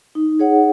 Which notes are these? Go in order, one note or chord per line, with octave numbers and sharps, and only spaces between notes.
D#4
G#4 C#5 F#5